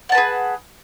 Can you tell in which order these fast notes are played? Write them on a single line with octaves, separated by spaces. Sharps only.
F#5 A5 B4 G#4